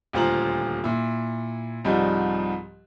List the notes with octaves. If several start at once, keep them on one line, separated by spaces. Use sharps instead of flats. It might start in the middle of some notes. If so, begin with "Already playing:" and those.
D#1 D2 F4 C5 A#5 F#7
A#2 E4
C2 G#2 F3 G3 G#3